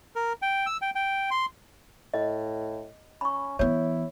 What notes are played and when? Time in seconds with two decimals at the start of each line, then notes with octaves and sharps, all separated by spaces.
0.16 A#4
0.42 G5
0.66 E6
0.82 G5
0.95 G5
1.31 C6
2.14 A2 D#5
3.21 C#4 B5 C#6
3.59 E3 B3 E4 C#5